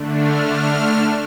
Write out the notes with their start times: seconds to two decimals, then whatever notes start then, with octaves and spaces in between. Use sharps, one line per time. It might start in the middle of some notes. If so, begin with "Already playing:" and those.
Already playing: D3 A3 D4
0.17 F6
0.46 F6